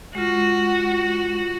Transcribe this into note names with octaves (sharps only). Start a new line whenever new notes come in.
G#3 F4 F#4